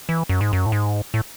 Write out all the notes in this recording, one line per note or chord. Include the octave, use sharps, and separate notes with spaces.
E3
F#2
G#2
F#2
A2
G#2
A2